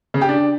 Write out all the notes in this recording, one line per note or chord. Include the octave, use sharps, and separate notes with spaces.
C#3
G4
D4